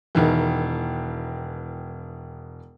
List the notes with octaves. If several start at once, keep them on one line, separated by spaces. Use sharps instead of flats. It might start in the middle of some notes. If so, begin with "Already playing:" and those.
E1 D#3 E3